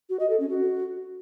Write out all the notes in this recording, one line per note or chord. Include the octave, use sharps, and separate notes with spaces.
F#4
D#5
A4
C#4
F#4